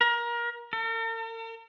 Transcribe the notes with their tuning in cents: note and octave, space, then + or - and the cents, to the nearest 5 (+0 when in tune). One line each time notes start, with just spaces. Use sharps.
A#4 +25
A#4 -45